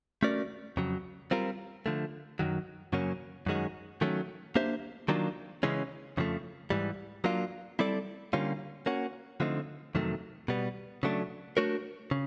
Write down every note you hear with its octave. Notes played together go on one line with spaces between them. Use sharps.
A3 C#4 F#4 A#4 D5
F2 C#3 F#3
G3 C4 F4 A#4
D3 F3 A3
F#2 D#3 F#3
F#2 C#3 F#3 A#3 C#4
F#2 D#3 G#3 C#4 F#4
D#3 F#3 A3 C#4
A#3 D4 G4 C5 E5
D#3 F#3 A#3 D4 F4
C#3 E3 G#3 C#4
F2 C#3 F3 A3
G#2 E3 G3
F#3 A#3 D4 F4
G3 C4 E4 A4 D5
D3 G3 A#3 C#4 F4
A#3 C#4 F#4
D3 F3 A3 C4 D#4
F2 C3 D#3 F#3 A3
B2 G3 B3
C#3 F#3 A3 D4
A3 D4 F#4 A#4 C#5
C#3